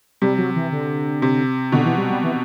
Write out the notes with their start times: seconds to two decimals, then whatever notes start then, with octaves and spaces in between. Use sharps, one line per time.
0.22 C3 G3
0.38 F#3
0.56 E3
0.72 D3
1.22 C3
1.72 B2 D3
1.85 E3
1.98 G3
2.10 G3
2.23 E3